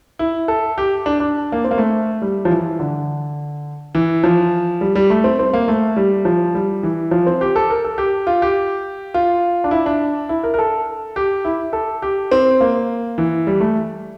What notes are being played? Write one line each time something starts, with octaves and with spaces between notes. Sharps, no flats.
E4
A4
G4
D4
D4
A#3
C4
A#3
A3
G3
F3
E3
D3
E3
F3
G3
G3
A3
C4
C4
A#3
A3
G3
F3
G3
E3
F3
C4
G4
A4
A#4
A4
G4
F4
G4
F4
D4
E4
D4
E4
A#4
A#4
A4
G4
E4
A4
G4
C4
A#3
E3
G3
A3